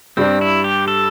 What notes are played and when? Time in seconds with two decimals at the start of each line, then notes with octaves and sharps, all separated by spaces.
0.17 G2 G3 C4 D4
0.41 E4
0.64 G4
0.88 A4